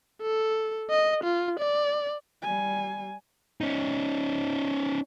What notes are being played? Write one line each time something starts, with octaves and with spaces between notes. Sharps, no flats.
A4
D#5
F4
D5
G3 G#5
C#4 D#4